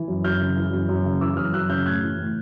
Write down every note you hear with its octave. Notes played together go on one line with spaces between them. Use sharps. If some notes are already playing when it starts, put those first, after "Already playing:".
Already playing: E3
F#2
F#2 F6 G6
C#3
E3
F#2
F#2
C#3
E3 D6 E6
F#2 D#6 F6
F#2 E6 F#6
C#3 F6 G6
A2 F#6 G#6
E3
A2